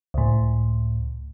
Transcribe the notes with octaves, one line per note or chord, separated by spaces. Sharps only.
C#2 A2